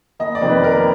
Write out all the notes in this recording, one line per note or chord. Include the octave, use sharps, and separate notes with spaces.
F#1 D#5
D5
F2 C3 D#3 C5
B4
F#1 A#4